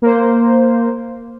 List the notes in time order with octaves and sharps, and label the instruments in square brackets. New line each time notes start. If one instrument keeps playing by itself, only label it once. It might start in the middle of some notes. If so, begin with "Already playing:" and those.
[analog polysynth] A#3 C5